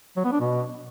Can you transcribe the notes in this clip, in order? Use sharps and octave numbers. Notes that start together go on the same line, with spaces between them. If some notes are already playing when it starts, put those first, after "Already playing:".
F#3
B3
D4
B2